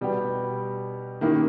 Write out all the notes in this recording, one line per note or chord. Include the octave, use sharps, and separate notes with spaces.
B2 G3 B3 G4
D#3 A#3 C#4 E4 G4